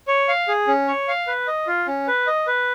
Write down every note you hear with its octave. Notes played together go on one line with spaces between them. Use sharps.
C#5
F5
G#4
C#4
C#5
F5
B4
D#5
F4
C#4
B4
D#5
B4